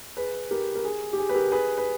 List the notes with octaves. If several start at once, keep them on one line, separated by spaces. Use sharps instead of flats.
G#4 B4
G4 A#4
A#4
G#4
G4
G#4
B4
G4 A#4
G#4 B4
B4